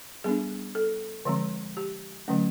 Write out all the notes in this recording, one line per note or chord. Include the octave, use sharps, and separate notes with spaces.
G3 B3 D4 G#4
A4
D3 F3 G#3 C4
G4
D3 F#3 A3 C#4